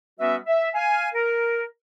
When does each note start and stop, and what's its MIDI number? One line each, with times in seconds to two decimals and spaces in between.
0.20 0.36 55
0.20 0.36 59
0.20 0.36 61
0.20 0.36 66
0.20 0.36 71
0.20 0.36 76
0.46 0.69 76
0.74 1.08 77
0.74 1.08 80
1.14 1.65 70